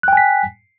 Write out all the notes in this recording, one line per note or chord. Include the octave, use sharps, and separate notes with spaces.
G5 G#5 F#6 B6